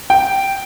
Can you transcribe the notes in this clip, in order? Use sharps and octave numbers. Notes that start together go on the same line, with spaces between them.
G5